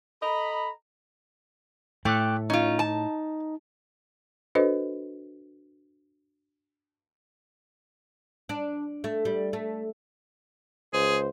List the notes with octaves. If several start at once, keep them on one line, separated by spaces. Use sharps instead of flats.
A4 D#5 A#5 B5
A2 A3 G5 D6 F#6
C#4 D#4 F4
A5
D4 F#4 A4 B4 C5 D#5
D4
A3
G3
A3
C#2 G#4 C5